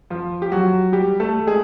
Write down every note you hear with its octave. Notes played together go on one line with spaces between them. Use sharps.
F3 F4
G4
F#3 F#4
G3 G4
A3 A4
G#3 G#4